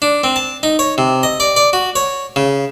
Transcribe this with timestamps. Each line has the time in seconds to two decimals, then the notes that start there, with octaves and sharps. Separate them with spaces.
0.02 D4
0.24 C4
0.36 A5
0.63 D#4
0.79 C#5
0.98 C3
1.23 D#5
1.40 D5
1.56 D5
1.73 F#4
1.96 C#5
2.36 C#3